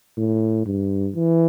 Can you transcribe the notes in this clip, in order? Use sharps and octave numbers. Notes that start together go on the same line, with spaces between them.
A2
G2
E3